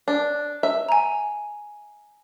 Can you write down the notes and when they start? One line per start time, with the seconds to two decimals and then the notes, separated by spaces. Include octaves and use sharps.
0.08 D4
0.63 E5
0.89 G#5 A#5